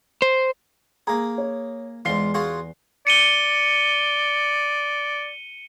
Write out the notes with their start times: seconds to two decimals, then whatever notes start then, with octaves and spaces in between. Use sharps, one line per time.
0.22 C5
1.07 A#3 G#4 A#5
1.38 C#5
2.05 E2 G#2 F4 C7 G7
2.34 F4 F#4 G#4
3.07 D5 C#7 D#7 G7